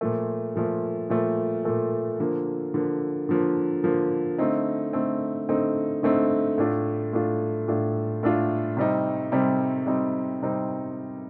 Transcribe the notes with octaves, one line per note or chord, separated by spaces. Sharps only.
A#2 F3 A3
A#2 F3 A3
A#2 F3 A3
A#2 F3 A3
D3 F3 A#3
D3 F3 A#3
D3 F3 A#3
D3 F3 A#3
D3 A3 C4 D#4
D3 A3 C4 D#4
D3 A3 C4 D#4
D3 A3 C4 D#4
A2 A3 D4 F4
A2 A3 D4 F4
A2 A3 D4 F4
A2 A3 D4 F4
C3 G3 C4 D#4
C3 G3 C4 D#4
C3 G3 C4 D#4
C3 G3 C4 D#4